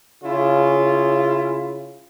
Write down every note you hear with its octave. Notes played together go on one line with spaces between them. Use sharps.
C#3 E4 F4